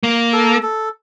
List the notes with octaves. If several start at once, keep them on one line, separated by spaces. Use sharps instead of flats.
A#3
A4
A4